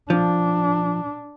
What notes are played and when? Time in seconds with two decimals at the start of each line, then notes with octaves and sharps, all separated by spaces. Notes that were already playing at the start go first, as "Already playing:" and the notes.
0.10 F3 D4